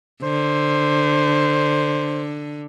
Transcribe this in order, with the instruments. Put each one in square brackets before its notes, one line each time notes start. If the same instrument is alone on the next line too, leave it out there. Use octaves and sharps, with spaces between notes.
[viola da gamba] D3 [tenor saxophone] C5